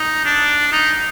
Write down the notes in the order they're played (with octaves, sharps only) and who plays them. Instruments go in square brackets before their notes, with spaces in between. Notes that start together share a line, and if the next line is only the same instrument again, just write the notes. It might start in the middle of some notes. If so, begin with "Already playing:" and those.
Already playing: [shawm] D#4
D4
D#4